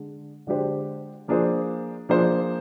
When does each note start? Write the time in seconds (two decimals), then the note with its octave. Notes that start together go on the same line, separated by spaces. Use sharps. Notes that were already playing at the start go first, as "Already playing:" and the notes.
Already playing: D3 G#3 D4
0.47 D3 G#3 D4 G4 C5
1.28 F3 A#3 D4 G#4 C5
2.09 F3 A#3 D4 G#4 C5